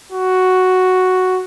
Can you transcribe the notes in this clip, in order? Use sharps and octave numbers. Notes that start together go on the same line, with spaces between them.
F#4